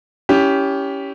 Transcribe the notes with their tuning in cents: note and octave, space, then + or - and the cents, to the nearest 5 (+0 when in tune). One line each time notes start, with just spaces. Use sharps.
C#4 +20 E4 +0 G4 +0